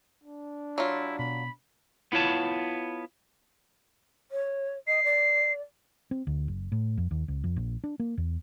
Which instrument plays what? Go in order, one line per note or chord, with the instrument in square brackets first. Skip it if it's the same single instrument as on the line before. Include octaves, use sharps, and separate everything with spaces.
[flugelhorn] D4
[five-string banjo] F#3 F4 [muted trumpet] E4
[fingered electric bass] B2 [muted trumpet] B5
[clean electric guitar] B3 E4 F4 C#5 A5
[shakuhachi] C#5
[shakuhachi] D#5 [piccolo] C7
[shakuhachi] D5
[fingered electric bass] C4
D2
F#1
A2
F2
D#2
C#2
F2
A#1
D4
A#3
E2